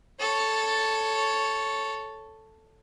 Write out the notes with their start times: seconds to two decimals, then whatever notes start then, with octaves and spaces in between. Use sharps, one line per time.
0.20 A4 C#5